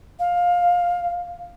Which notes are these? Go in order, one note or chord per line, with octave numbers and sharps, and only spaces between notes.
F5